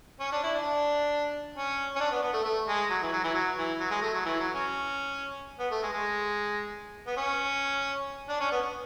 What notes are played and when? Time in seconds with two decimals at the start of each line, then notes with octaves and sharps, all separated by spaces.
0.20 C#4
0.32 D4
0.43 E4
0.55 D4
1.55 C#4
1.96 C#4
2.00 D4
2.11 B3
2.23 B3
2.33 A3
2.45 A3
2.68 G#3
2.90 F#3
3.02 E3
3.12 F#3
3.24 E3
3.34 F#3
3.58 E3
3.80 F#3
3.91 G#3
4.02 A3
4.14 F#3
4.25 E3
4.40 F#3
4.54 C#4
5.59 B3
5.71 A3
5.83 G#3
5.93 G#3
7.07 B3
7.17 C#4
8.29 D4
8.40 C#4
8.52 B3